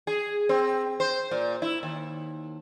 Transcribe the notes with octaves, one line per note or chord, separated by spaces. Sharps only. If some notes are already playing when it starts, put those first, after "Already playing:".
G#4
C4
C5
A#2
E4
D#2